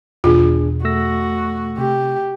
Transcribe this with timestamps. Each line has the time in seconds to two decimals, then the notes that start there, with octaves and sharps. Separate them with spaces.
0.24 G#1 E2 B2 D4 F4 G#4
0.85 A3 F#4 E6 A#6
1.78 C3 G4